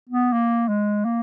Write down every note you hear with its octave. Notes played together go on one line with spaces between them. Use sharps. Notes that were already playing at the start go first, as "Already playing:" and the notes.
B3
A#3
G#3
A#3